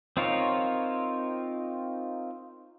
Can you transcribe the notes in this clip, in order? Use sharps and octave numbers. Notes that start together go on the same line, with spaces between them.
C4 D#4 F4 A#4 C#5